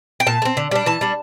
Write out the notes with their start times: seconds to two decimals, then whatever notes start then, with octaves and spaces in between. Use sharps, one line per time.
0.20 G5
0.27 A#2 A5
0.42 A3
0.45 C4
0.57 D3
0.71 G3 D4
0.86 E3 A5
1.01 G3 D4